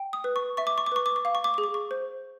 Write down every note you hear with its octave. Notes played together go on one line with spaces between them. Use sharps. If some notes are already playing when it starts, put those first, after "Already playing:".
Already playing: G5
D#6
B4
C#6
E5 C#6
D6
C#6
D6
B4 C#6
D6
C#6
F5 D6
C#6
D6
G#4 C#6
D6
C#6
C5